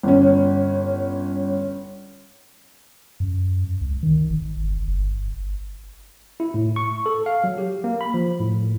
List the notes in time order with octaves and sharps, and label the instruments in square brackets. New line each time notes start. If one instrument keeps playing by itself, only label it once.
[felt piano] G1 C#4
[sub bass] F#2
C#2
D#3
G#1
G1
G1
[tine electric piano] E4
A2
C#6
A4
F5
F#3
G4
A#3
B5
F3
A2